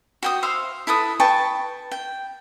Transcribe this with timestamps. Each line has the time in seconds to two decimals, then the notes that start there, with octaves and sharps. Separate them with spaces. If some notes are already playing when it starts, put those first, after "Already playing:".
0.23 F#4 G5 D#6
0.43 C5 E5 F5 C6
0.87 E4 A4 B4 D#6
1.20 B4 G5 A5 C#6
1.91 G5